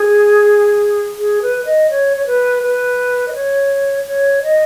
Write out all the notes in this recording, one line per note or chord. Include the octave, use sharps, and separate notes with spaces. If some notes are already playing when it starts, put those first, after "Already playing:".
Already playing: G#4
G#4
B4
D#5
C#5
C#5
B4
B4
D#5
C#5
C#5
D#5